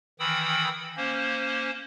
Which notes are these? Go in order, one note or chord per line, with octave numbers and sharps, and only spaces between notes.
D#3 E3 G5 B5 D#6 E6
A#3 C#4 C5